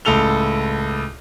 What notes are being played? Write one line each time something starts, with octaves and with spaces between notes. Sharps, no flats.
C#2 A2 A4 F7 G7